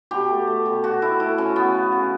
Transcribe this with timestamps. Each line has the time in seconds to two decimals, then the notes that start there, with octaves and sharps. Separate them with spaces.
0.11 B2 G4
0.29 A3
0.47 A3
0.66 B2
0.84 B2 F#4
1.02 A3 E4
1.20 A3 E4
1.38 B2 C#4
1.56 C#3 B3
1.74 F#3
1.92 C#3